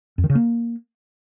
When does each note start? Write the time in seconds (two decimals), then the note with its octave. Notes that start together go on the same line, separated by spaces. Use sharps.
0.18 F2
0.24 D#3
0.30 C#3
0.35 A#3